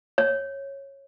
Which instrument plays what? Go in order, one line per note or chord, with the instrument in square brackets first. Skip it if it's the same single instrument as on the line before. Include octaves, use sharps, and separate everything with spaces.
[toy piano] C#5